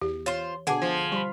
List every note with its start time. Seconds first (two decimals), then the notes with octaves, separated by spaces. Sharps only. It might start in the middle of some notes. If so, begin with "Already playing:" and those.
0.01 E2 G4
0.26 F4 C5 C#5 C6
0.67 B2 D3 G#4 F#5 G#5 A5 D6
0.82 F3
1.12 G3 B5 C#6